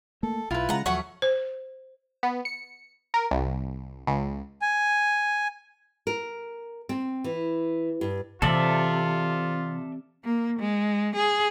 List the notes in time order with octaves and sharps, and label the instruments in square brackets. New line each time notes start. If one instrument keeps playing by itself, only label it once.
[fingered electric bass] A3 A#3 [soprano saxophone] A4
[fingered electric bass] B1 [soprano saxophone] E4 [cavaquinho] F4 B4
[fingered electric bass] C#3 G#3 [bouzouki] F#5 A#5
[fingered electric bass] D#2 F3 F#3 [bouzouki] A3 C#4 [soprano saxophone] F#5 [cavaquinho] C#6
[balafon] C5
[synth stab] B3
C#7
A#4
C2
C#2
[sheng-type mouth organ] G#5
[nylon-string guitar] A#4
C4
E3
G2
[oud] C3 [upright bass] E3 [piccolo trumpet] F4 [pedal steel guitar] A4 D5 E5
[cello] A#3
G#3
G#4